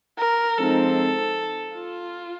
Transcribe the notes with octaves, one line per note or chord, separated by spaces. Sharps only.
A#4
F3 G#3 C4 D#4 A4
F4